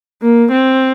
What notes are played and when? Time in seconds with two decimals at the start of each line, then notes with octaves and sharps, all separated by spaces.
0.22 A#3
0.52 C4